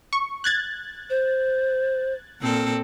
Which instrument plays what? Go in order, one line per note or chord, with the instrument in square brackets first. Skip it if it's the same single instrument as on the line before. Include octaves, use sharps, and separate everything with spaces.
[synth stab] C#6
F#6 G#6 A6
[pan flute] C5
[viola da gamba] A#2 C4 A4